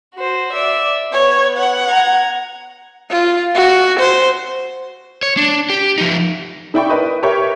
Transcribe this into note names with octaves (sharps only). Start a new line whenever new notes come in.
F#4 C5
D5 E5
B3 C#5
F#5
A#5 G#6
F4
F#4
C5
C#5
D4
G4
F3 D#4
D#4 E4 D5 G5 B5 C#6
A#4 B4 D#5
G4 A#4 B4 C#5 E5 G6